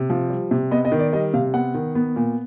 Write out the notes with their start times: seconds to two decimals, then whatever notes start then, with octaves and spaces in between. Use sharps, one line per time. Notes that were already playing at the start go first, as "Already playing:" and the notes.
Already playing: C3
0.10 F3
0.30 G3
0.51 C3
0.71 B3 D#5
0.85 D#5
0.92 D#3
0.99 D5
1.13 G3 D#5
1.34 C3 F5
1.54 B3 F#5
1.74 D#3
1.95 B3
2.16 A#2